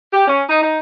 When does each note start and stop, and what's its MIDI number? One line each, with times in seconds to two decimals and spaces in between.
0.13 0.26 67
0.28 0.43 61
0.49 0.62 63
0.62 0.79 63